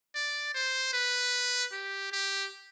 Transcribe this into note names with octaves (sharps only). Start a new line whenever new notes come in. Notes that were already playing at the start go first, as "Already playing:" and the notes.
D5
C5
B4
G4
G4